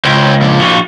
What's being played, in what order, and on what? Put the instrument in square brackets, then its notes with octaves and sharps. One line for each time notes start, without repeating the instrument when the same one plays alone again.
[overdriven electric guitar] C#2 [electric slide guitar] C5 C#5 G5
[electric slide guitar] F3 A#3 D4
[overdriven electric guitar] F#4 F5